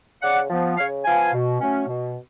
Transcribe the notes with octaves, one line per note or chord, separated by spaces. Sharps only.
C#3 D5 F#5
F3 B3
C#3 C#5 F5
F3 B3 F5 G#5
B2
F#3 A3 C#4
B2